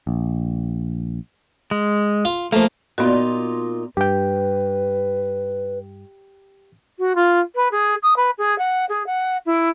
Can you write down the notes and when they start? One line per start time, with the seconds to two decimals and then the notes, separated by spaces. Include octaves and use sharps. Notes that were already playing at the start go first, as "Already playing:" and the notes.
0.07 A#1
1.71 G#3
2.25 F4
2.52 F3 A3 A#3
2.98 A#2 B3 D#4 F4 F#4
3.97 G2 G4 B4 G5
6.99 F#4
7.15 F4
7.55 B4
7.72 G#4
8.03 D#6
8.17 B4
8.38 G#4
8.59 F#5
8.89 G#4
9.07 F#5
9.46 E4